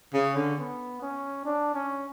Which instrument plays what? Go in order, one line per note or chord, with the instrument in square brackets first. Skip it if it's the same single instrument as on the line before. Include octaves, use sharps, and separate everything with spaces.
[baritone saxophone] C#3 [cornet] C#4
[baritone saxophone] D3
[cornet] B3
C#4
D4
C#4